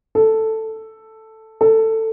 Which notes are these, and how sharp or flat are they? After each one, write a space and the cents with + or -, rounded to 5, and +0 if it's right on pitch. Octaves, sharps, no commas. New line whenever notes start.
A4 +5
A4 +15